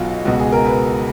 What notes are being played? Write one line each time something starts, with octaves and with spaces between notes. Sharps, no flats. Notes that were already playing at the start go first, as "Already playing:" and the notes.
Already playing: B1 B2 F4 F#4
C#2 B2 F#4
G#4
A#4
B4